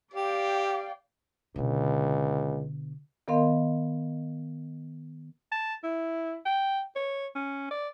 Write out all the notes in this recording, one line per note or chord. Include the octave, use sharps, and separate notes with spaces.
G4 D5 F5 G5
C#2 B2 D3
D#3 B3 A#4 D#5 F5 C6
A5
E4
G5
C#5
C#4
D5